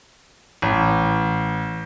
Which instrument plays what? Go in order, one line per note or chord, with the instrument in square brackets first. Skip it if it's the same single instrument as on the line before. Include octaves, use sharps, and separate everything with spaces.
[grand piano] A1